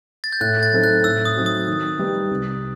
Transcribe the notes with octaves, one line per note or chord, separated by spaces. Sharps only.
A6
G6
A2 F#6
A6
F#3 C4 D#4 A4
F#6
A2 E6
D#6
F#3 C4 D#4 F#4
D#6
D#3
G3 D#4 G4 B4
C2